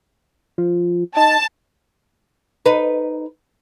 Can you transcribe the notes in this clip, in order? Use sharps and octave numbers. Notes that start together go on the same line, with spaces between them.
F3
D#4 A5
D#4 B4